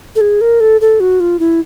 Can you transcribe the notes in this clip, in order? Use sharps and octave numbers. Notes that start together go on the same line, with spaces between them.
A4
G#4
A#4
A4
A4
F#4
F4
E4